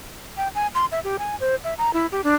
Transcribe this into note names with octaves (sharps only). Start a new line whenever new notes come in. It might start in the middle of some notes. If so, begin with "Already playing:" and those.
G5
G#5
C6
E5
G4
G#5
C5
E5
A#5
E4
G4
D4